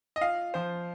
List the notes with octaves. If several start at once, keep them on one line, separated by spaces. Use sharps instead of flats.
D#5
F4 F5
F3 C5